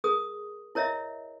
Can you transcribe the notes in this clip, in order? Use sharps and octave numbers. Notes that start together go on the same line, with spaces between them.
G#4 A#4 D#6
E4 A#4 C#5 D#5 E5